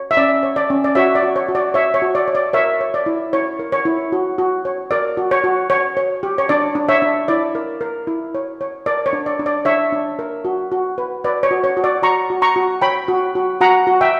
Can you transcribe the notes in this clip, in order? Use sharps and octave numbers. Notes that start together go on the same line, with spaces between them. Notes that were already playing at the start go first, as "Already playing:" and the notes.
Already playing: C#5
E5
C#4 D5
C#5
D5
C#4
D5
F#4 C#5 E5
D5
F#4
C#5
F#4
D5
C#5 E5
C#5
F#4
D5
C#5
D5
A#4 C#5 E5
C#5
D5
E4
E4 C#5
A#4
C#5
E4
F#4
F#4
C#5
A#4 D5
F#4
C#5
F#4
C#5
C#5
G4
C#5
D4 D5
D4
C#5 E5
D4
E4 D5
A#4
A#4
E4
C#5
C#5
A#4 D5
C#5
D4
D5
D4
D5
D4 C#5 E5
D4
A#4
F#4
F#4
B4
B4 D5
C#5
F#4
C#5
F#4
D5
F#4 A#5 C#6
F#4
A#5 C#6
F#4
C#5 G5 B5
F#4
F#4
F#4 F#5 A#5
F#4
E5 G5